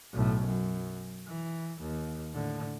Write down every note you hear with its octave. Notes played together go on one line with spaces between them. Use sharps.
B1 A2
F#2
E3
D#2
A2 D3